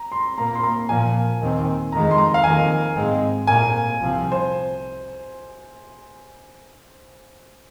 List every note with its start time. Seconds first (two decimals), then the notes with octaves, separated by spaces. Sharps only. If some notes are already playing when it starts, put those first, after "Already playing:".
Already playing: A#5
0.12 C6
0.38 A#2 A#3 A#5
0.55 C6
0.63 A#5
0.89 A#2 F3 A#3 G#5
1.41 D#2 D#3 C4
1.92 F2 D#3 G#3 A#5
2.11 C6
2.18 A#5
2.34 F5
2.44 F2 D#3 A#3 G#5
2.96 G#2 G#3 C4
3.47 A#2 A#3 G#5
3.99 C2 C3 F3 C4
4.32 C5